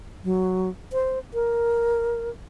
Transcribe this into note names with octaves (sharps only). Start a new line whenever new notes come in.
F#3
C5
A#4